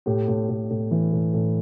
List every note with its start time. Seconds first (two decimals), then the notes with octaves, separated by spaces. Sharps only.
0.06 A2 G4
0.28 A2
0.49 A2
0.70 A2
0.91 E3
1.13 A2
1.34 A2